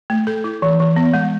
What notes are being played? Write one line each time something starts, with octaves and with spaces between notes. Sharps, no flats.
A3
A4
E4
E3
E3
B3
G#3